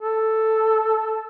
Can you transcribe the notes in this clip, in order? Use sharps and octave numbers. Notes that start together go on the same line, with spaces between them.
A4